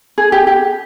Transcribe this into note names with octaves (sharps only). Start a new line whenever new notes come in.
G#4
G4
G4